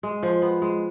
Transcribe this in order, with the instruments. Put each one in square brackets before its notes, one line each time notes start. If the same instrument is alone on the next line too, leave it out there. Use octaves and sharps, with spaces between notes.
[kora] G#3
F3
B3
G#3